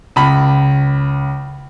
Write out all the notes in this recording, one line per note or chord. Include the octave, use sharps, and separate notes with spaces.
C#2 B5